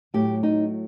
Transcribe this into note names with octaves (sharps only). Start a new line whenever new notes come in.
A2 F#3 A3 G4
D#4